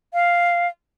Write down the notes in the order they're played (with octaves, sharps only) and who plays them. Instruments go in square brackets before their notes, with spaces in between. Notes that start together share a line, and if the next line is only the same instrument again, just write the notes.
[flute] F5